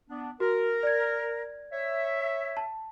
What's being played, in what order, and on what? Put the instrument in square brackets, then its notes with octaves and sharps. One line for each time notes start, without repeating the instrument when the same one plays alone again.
[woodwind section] B3 D4
[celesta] F#4 [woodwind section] A#4
[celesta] D5 G#6
[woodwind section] C#5 E5
[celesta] A5